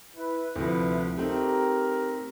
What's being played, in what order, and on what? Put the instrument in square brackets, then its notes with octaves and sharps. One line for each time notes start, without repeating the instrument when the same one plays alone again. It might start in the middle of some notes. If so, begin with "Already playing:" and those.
[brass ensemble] E4 B4
[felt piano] D2 C3 F3 [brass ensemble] E4 B4
[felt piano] A3 C4 D#4 [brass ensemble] G4 A#4